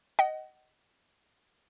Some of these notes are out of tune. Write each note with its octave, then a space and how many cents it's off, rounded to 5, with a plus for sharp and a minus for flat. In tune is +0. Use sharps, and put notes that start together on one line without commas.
D#5 +0 F#5 +35